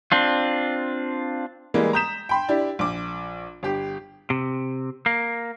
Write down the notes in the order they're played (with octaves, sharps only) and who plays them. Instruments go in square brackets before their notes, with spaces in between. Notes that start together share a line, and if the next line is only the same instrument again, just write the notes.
[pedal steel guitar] C4 D4 F4
[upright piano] E3 G3 G#3 A#3
A#5 D#6 G6 B6 E7
G5 B5 C6
D4 E4 G4
A#1 D6
G1 G4
[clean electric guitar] C3
A#3